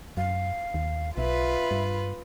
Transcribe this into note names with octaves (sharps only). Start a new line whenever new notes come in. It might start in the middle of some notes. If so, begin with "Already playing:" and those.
F#2 F5
D#2
B1 F4 B4 E5
G2